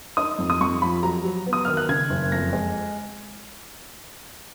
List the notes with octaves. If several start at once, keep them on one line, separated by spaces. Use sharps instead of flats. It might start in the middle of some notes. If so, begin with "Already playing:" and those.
D#4 D#6
F2
D#6
F2 C#6
F3 B5
F#3 A#5
F#3
B3
D#6
D#3 F6
F#6
C#3 G#6
F#1
F2 A#6
G#3